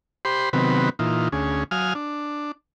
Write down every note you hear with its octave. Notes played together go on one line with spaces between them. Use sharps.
G4 C5 B5 C6
C3 D#3 F#3 B3 C4 B4
A#2 E3 D#4 F4
D2 C#4 G#4
F#3 F5 G#5 D#6 F6
D4